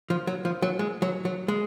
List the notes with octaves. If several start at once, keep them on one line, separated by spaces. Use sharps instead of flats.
F3
F#3
F3
F#3
G#3
F#3
F#3
G#3